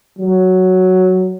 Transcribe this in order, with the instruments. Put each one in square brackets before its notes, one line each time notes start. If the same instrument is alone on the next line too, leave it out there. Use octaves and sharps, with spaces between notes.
[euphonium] F#3